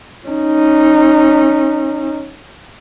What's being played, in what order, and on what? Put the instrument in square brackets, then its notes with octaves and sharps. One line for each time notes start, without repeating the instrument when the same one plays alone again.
[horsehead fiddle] C#4 D#4